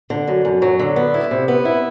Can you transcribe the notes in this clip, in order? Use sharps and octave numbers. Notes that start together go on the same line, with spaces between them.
D3
F#2
F#2
F#3
D3
B3
E4
C3
B3
E4